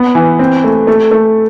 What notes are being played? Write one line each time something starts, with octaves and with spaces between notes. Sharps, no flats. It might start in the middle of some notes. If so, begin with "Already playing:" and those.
Already playing: B3
E3
C4
A3
A3
A3